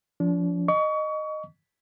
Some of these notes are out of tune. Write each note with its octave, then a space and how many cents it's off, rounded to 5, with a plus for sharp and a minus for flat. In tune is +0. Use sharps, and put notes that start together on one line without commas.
F3 +0 D4 -35
D#5 -10 C#6 +30